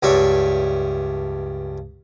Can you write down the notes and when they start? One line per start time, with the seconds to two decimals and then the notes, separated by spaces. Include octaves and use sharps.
0.03 C#2 G2 D4 C#5 E5